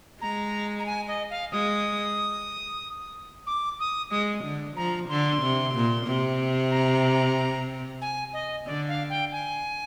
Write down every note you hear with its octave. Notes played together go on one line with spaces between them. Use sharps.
G#3 A#5
A#5
G#5
D#5
F5
G#3 D#6
D6
D#6
G#3 D#6
D3
F3 A#5
D3 C6
C3
A#2
C3
A#5
G#5
D#5
D3 D5
F5
G5
G#5